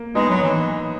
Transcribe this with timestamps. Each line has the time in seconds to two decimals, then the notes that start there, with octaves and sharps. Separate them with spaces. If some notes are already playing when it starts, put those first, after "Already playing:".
Already playing: A#3
0.15 G#3 B3 D#4
0.30 F#3
0.43 E3